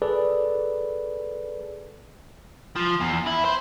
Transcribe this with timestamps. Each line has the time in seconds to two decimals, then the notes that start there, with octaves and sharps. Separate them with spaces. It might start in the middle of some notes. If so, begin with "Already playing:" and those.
0.02 G#4 A4 B4 D5
2.76 F3
3.00 E2
3.26 E4
3.45 C5